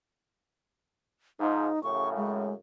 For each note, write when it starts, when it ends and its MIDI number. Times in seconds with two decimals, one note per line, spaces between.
1.40 1.69 44
1.40 1.69 53
1.40 1.82 63
1.83 2.54 42
1.83 2.54 45
1.83 2.54 49
1.83 2.09 85
2.17 2.54 56